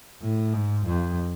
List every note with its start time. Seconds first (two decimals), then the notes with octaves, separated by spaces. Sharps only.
0.22 A2
0.54 G#2
0.86 F2